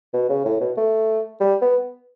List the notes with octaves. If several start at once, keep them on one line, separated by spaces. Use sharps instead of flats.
B2
C#3
A2
B2
A3
G3
B3